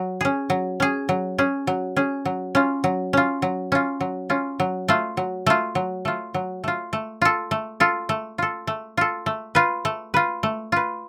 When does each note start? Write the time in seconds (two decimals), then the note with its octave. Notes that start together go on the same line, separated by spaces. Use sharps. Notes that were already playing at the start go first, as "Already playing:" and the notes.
Already playing: F#3
0.21 C#4 G#4
0.50 F#3
0.80 C#4 G#4
1.09 F#3
1.38 C#4 G#4
1.67 F#3
1.96 C#4 G#4
2.25 F#3
2.55 C#4 F4
2.84 F#3
3.13 C#4 F4
3.42 F#3
3.72 C#4 F4
4.00 F#3
4.30 C#4 F4
4.60 F#3
4.88 A3 F4
5.17 F#3
5.46 A3 F4
5.75 F#3
6.05 A3 F4
6.34 F#3
6.64 A3 F4
6.93 A3
7.22 F4 A4
7.51 A3
7.80 F4 A4
8.09 A3
8.38 F4 A4
8.67 A3
8.97 F4 A4
9.26 A3
9.55 F4 B4
9.85 A3
10.14 F4 B4
10.43 A3
10.72 F4 B4